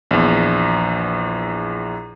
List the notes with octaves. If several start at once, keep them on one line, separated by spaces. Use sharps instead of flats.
A#1 E2